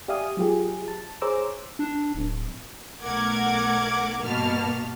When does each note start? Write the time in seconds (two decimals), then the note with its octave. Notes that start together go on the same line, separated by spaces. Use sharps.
0.08 G4 D5 E5 F5 G#5 D#6
0.37 F#3 F4 G4 G#4
0.88 A5
1.22 G#4 C5 C#5 A#5 D6 E6
1.79 D4
2.15 D1
3.02 B1 A3 A#4 F#5 D6 G#6
4.21 G2 B2 A#3 A5 F6